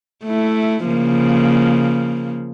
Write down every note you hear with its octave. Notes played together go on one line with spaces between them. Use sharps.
A3 E4
C#3 F3 A#3